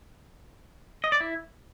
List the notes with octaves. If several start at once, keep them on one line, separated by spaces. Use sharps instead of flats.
D#5
D5
E4